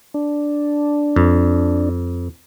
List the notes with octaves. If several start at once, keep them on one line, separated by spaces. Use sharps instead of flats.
D4
F2